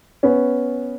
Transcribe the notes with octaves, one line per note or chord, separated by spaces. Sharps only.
B3 C#4